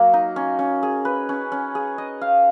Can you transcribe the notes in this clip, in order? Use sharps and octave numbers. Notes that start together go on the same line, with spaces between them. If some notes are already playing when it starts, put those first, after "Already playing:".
Already playing: F#3 A#3
D#4
C#4
C#4
G#4
B4
C#4
C#4
G#4
D#5
F5